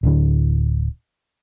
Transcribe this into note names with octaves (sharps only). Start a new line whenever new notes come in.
D1 D3